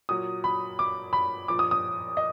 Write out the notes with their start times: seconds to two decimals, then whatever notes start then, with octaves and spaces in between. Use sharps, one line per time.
0.09 A#2 F#3 D#6
0.44 B5
0.79 D6
1.13 B5
1.48 A#2 F3 D6
1.59 D#6
1.71 D#6
2.17 D#5